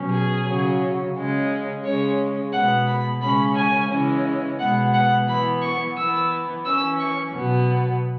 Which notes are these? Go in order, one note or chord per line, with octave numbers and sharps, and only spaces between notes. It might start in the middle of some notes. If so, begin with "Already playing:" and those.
Already playing: B2 F#3 C#4
G#4
C#3 F#3 C#4
C#3 G#3 C#4
C#3 G#3 C#4 C#5
B2 G#3 B3 F#5
B5
C#3 G#3 C#4 B5
G#5
C#3 E3 G#3 C#4
B2 G#3 B3 F#5
F#5
E3 B3 B5
C#6
E3 B3 E6
E3 C#4 E6
C#6
B2 F#3 B3